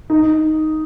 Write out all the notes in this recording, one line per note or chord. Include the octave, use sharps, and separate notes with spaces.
D#4